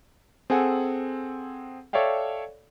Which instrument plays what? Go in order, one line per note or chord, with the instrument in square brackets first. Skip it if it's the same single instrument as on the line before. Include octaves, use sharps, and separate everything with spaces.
[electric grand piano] C4 G#4 A4 F#5 G#5
A4 C#5 D5 E5 F5 G5